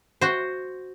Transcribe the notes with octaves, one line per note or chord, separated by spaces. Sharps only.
F#4 C5